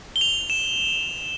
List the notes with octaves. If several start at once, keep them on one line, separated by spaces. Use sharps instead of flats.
G7
F7
E7